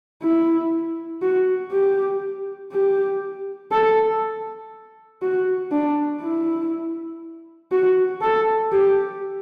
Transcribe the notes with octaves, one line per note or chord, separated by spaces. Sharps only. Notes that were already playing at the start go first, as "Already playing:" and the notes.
E4
F#4
G4
G4
A4
F#4
D4
E4
F#4
A4
G4